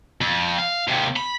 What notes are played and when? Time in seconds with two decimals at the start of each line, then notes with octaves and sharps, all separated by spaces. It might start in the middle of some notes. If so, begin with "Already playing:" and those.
0.21 F2
0.59 F5
0.87 D#2 C3
1.16 B5